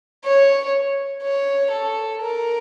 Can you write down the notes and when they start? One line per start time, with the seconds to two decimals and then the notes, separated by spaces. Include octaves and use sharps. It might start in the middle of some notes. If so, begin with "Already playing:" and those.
0.24 C#5
1.23 C#5
1.71 A4
2.21 A#4